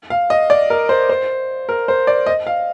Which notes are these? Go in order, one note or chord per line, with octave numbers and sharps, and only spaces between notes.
F5
D#5
D5
A#4
C5
C5
A#4
C5
D5
D#5
F5